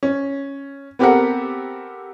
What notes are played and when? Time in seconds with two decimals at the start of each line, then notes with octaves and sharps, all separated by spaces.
0.03 C#4
0.99 B3 C4 G4 A4 A#4 F#5